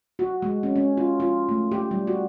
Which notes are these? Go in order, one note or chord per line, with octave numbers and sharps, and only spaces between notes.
F#4
G#3
C#4
C#4
F4
F4
A3
G4
G3
F#4